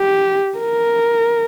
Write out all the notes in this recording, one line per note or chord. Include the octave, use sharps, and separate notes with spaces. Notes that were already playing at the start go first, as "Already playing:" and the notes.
Already playing: G4
A#4